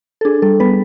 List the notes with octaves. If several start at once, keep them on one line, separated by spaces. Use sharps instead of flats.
A4
D4 G#4
G3 A4
G3 B3 B4